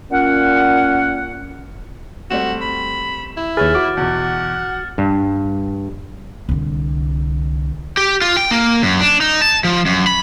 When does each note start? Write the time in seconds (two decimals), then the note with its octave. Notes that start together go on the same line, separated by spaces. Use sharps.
0.11 A#2 C#4 F#5
2.31 G3 A3 C4 F#4 E7
2.61 B5
3.37 E4
3.57 D#2 G#4 B4 C#5 F6 A6
3.75 F#4 D6
3.97 E2 B2 F#5
4.98 G2
6.49 C2 D3
7.97 G4
8.22 F4
8.37 G5
8.51 A#3
8.82 F#2
9.01 D4
9.21 D#4
9.42 A5
9.64 F3
9.86 F#2
10.07 B5